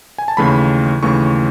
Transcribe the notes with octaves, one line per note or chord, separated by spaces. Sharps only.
G#5
A5
D#2 C#3 E3 A3 B5
D#2 C#3 E3 A3 C#6